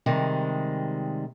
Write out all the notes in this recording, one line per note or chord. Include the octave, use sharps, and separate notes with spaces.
C3 D#3 G3 G#3